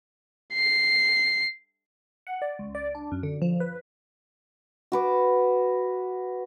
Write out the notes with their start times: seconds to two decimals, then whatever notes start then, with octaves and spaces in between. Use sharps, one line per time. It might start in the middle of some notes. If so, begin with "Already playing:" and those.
0.54 C7
2.27 F#5
2.42 D5
2.59 C#2
2.75 D5
2.95 D4
3.12 F#2
3.23 D3
3.42 F3
3.60 B4
4.92 F#4 B4 D6